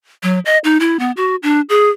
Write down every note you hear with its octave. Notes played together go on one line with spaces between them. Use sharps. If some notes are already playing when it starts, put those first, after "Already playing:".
F#3
D#5
D#4
E4
B3
F#4
D4
G#4